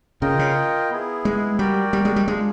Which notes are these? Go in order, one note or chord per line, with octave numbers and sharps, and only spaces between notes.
C#3 F4 A#4 D#5 G5
C#3
B3 E4 G#4
G#3
G3 F#4 A#4 D5 G5
G3
G#3
G3
G#3 D4 F4 G#4